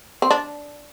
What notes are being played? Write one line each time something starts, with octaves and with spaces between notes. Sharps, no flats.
C4
D4